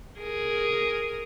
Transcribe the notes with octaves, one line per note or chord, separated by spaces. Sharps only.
G#4 A#4